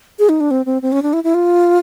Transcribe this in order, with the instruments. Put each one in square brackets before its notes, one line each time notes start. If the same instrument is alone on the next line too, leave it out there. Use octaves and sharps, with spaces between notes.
[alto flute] G#4
D#4
D4
C4
C4
C4
C#4
D4
E4
E4
F4